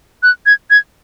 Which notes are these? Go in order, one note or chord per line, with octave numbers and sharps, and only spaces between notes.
F#6
G#6
G#6